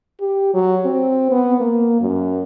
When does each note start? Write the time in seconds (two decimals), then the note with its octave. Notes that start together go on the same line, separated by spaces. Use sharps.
0.20 G4
0.54 F#3
0.85 C4
1.31 B3
1.60 A#3
2.01 F#2